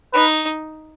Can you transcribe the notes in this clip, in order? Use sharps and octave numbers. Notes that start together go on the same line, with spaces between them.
D#4 B4